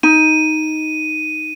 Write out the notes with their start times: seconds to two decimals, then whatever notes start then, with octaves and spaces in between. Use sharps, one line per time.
0.03 D#4 D#7